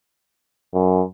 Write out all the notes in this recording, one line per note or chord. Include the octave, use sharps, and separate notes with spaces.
F#2